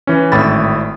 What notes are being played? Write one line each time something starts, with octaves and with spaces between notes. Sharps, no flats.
E3 C#4
G#1 A2 B5 A6